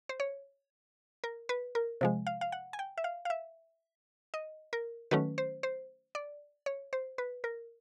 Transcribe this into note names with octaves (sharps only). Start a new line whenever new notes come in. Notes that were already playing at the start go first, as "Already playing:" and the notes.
C5
C#5
A#4
B4
A#4
C3 F3 G#3
F5
F5
F#5
G#5
G5
E5
F5
F5
E5
D#5
A#4
D#3 F#3 A3 C#4 B4
C5
C5
D5
C#5
C5
B4
A#4